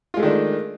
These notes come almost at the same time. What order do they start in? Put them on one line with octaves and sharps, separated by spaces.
F4 G#3 A3 D#3 D4